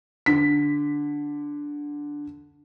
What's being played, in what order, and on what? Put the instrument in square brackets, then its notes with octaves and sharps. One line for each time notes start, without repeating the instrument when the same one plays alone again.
[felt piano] D3 B6